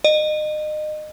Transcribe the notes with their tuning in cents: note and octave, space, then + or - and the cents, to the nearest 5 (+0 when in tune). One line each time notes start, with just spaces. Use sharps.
D#5 -30